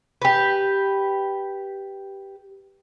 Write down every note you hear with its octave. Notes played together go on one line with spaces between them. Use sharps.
G4 B4